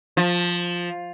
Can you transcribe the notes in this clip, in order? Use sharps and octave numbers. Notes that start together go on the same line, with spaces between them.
F3